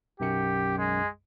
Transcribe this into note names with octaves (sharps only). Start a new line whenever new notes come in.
B1 F#2 G4 C#7
G#3